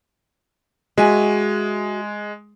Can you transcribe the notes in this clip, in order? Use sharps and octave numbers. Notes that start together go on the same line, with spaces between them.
G#3 F#4 E5 G#5